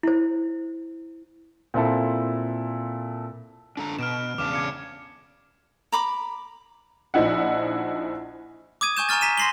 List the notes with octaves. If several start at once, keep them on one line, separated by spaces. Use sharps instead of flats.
E4 C5
A#2 C4 E4 A4
D4 A4 A#5
B2 F6 D7 E7
E2 C#3 D4 D6 F6 E7
D6 G#6 C#7
A#5 B5 D6
A#1 F3 D#4 E4 F#5
D6 D#6 G#6 D#7
G#5 C#6 G6 E7
G#5 A#5 C#6 F6 A6
A#5 B6 D#7 E7
C6 A#6 C7 F#7 G7